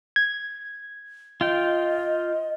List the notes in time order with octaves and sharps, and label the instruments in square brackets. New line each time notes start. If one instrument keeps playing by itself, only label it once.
[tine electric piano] G#6
[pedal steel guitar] F4 G5 [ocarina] D#5